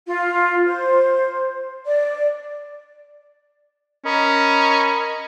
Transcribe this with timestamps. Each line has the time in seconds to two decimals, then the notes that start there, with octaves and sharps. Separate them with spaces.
0.07 F4
0.67 C5
1.86 D5
4.05 C#4 A#4 D#5 B5